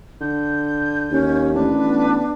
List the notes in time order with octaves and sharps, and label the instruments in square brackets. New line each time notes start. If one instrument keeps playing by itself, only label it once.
[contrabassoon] D3 [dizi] G6
[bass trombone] D#2 [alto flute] C#4
[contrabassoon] A1 [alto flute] D4 [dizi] B4
[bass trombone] B3